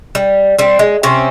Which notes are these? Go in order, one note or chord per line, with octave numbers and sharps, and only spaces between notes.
G3
G3 C4
G#3
C3 C4 C#4